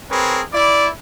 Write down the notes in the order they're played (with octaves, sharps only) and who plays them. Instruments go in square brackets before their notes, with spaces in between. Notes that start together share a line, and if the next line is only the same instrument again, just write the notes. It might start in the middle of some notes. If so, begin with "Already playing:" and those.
[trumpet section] C4 G#4 A#4 B4 C#5
E4 D5